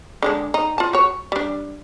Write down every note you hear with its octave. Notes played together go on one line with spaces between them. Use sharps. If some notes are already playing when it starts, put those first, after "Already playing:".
D3 G#3 D4
D#4
F4 A5
F#4 C#5
G3 D4